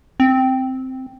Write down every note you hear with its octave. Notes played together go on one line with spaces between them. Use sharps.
C4